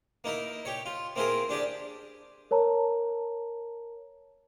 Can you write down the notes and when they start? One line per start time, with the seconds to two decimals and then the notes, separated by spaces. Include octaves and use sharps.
0.24 A#3 D#4 E4 A#4
0.65 G4 C#5
0.86 F4
1.16 A#3 C4 E4 F4 G#4 A#4
1.49 D4 G4 G#4 D5
2.51 A#4 C#5 A5 A#5